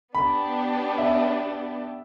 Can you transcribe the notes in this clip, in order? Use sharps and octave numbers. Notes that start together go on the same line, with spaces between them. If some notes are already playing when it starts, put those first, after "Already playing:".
B3 D4 G4 B5
E5